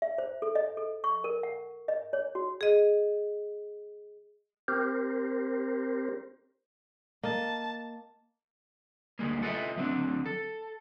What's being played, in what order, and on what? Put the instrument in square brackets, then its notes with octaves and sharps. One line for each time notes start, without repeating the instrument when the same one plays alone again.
[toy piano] E5
C5
A4
D#5
A4
C#6
A#4
F#5
D#5
C#5
F#4
[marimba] G#4 D#5
[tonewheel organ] C4 G4 A#4 C5
[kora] A#3 D#5 [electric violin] A5
[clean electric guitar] D2 G3 G#3 A#3
F4 A4 B4 C#5 D#5 E5
D2 F#3 C4 D4
A4